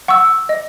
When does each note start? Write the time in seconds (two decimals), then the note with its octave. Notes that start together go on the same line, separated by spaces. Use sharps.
0.08 F#5 C#6 E6
0.49 D#5